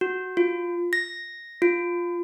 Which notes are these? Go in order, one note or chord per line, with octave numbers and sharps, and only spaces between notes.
F#4
F4
A#6
F4